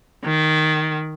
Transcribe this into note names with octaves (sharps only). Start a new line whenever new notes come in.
D#3